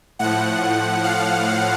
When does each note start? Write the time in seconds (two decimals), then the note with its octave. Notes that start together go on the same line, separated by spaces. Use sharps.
0.19 A2 F3 F#5
1.04 F5